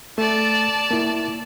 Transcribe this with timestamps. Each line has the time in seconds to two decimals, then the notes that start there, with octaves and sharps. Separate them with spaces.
0.18 A3 D5 A5
0.91 A#3 E4